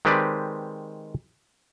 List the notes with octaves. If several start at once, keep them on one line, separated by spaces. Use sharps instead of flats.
D#3 G#3 C4 G4 B4 D5